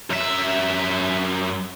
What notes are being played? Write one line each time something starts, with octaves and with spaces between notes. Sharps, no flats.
F#2 E5